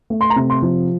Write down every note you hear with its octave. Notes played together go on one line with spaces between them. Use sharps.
A3
C6
A#5
C3
C6
F3